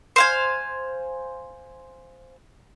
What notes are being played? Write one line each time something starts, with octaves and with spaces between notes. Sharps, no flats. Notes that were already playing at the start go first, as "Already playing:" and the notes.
C5 F5 G#5